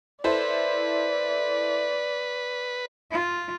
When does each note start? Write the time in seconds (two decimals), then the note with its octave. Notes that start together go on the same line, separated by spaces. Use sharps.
0.24 E4 A4 B4 C5 D5
3.11 F4